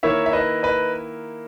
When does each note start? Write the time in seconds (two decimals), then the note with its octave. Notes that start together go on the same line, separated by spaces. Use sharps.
0.03 D#3 A#3 E4 C#5 E5
0.26 E5
0.33 B4 D#5
0.63 B4 D#5